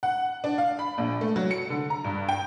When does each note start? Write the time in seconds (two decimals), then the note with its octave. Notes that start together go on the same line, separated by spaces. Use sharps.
0.03 F#5
0.44 D4
0.58 F5
0.79 B5
0.98 A#1
1.21 A3
1.36 F#3
1.51 C#7
1.70 D3
1.90 A#5
2.04 G2
2.29 G5